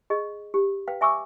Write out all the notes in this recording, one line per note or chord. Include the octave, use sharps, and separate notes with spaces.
G#4 D#5
G4
B4 F5 G5
E5 G#5 C#6 D6 E6